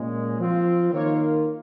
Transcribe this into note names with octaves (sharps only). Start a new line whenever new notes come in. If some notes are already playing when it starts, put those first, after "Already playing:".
Already playing: A#2 G#3 C#4
F3 C4 F4
D#3 A#3 F4 C#5